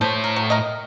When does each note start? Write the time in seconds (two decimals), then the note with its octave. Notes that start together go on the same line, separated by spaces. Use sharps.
0.01 A2 A4 C5 C#5
0.24 A#4
0.36 F#3
0.50 A#4 D#5